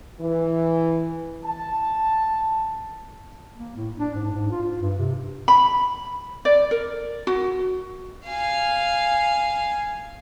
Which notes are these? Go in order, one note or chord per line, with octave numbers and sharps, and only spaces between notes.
E3
A5
A#3
A2
D4
G#2
G#2
F4
F4
G2
C3
B5
D5
A#4
F#4
F5 G#5